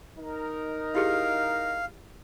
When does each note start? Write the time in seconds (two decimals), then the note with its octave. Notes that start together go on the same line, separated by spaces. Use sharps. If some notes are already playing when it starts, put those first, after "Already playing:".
0.17 D#4 A#4
0.95 E4 G4 G#4 F5